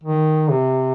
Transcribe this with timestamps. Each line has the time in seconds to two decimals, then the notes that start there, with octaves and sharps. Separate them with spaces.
0.03 D#3
0.50 C3